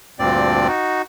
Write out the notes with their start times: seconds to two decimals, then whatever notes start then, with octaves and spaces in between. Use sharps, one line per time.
0.19 D2 G2 A#2 C4 D5
0.68 D#4 F#4